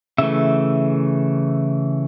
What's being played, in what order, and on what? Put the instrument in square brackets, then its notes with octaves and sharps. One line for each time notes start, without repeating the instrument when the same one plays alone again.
[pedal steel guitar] C#3 E3 A3 E5